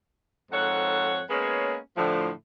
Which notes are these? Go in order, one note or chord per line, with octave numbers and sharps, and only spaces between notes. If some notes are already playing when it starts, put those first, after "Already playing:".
F2 G#2 A4 C#5 F#5
G#3 A#3 B3 C#4 G#4 C#5
A2 D3 F3